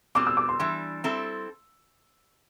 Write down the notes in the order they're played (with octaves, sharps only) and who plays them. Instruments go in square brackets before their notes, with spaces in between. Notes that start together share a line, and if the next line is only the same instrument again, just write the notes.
[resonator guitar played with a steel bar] B2 G3 C4 [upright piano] D6
[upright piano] E6
D6
C6
[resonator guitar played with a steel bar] E3 G3 D4 [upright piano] C6
[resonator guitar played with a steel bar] G3 C4 E4 A4